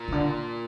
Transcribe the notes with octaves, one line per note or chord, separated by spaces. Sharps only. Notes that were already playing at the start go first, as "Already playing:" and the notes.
Already playing: A#2
C3
D3